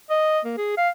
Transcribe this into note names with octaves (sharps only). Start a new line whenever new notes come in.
D#5
A#3
G#4
F5